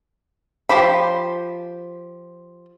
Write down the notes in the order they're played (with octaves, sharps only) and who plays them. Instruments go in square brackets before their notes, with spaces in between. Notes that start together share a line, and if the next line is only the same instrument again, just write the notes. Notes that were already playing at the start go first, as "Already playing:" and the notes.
[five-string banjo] F3 G4 C5 B5